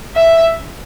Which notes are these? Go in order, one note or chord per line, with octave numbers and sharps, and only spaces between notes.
E5